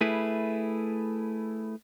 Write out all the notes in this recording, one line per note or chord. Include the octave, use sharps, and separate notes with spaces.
A3 E4 G#4 B4